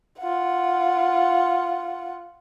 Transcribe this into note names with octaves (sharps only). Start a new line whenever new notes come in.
F4 F#5